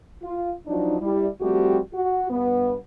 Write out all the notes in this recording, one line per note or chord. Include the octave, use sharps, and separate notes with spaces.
F4
F3 F#3 D4 D#4
G3 E4
F3 G3 A3 C4 F#4 G4
F#4
G2 B3